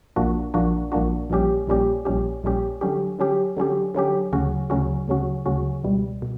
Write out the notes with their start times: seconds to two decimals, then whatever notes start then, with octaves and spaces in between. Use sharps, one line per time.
0.16 A#1 A#2 A#3 D4 F#4
0.54 A#1 A#2 A#3 D4 F#4
0.92 A#1 A#2 A#3 D4 F#4
1.30 A#1 A#2 G3 C#4 G4
1.67 A#1 A#2 G3 C#4 G4
2.05 A#1 A#2 G3 C#4 G4
2.44 A#1 A#2 G3 C#4 G4
2.81 D3 F#3 C#4 G4
3.19 D3 F#3 C#4 G4
3.57 D3 F#3 C#4 G4
3.95 D3 F#3 C#4 G4
4.32 D2 C#3 F#3 C#4 F#4
4.70 D2 C#3 F#3 C#4 F#4
5.08 D2 C#3 F#3 C#4 F#4
5.46 D2 C#3 F#3 C#4 F#4
5.84 C#2 B2 G3
6.22 B2